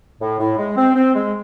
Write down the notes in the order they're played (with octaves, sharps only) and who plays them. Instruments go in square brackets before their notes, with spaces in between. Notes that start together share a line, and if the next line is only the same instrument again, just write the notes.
[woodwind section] A2
A2
G#3
C4
C4
G#3